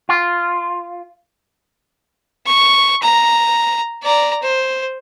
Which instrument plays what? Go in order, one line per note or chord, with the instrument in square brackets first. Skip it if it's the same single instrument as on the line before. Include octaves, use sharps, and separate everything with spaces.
[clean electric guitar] F4
[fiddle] C#6
A#5
D5 A#5
C5